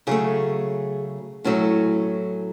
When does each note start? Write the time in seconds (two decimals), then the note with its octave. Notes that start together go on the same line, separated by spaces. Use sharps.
0.07 C#3 F#3 A3 G#4
1.44 A2 F#3 A3 C#4